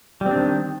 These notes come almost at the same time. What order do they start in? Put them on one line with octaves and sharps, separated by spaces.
G3 C4 D4 D#3